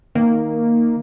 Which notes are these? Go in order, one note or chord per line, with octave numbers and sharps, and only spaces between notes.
D#3 A#3